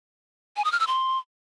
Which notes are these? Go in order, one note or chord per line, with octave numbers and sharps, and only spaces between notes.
G#5
D#6
F6
E6
C6